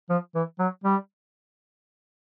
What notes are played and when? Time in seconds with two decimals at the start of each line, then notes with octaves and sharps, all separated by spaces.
0.10 F3
0.35 E3
0.60 F#3
0.84 G3